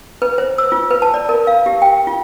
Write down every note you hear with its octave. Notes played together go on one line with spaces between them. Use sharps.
B4
C5
E6
F4
B4
A5
D5
A#4
F5
G4
G5
F4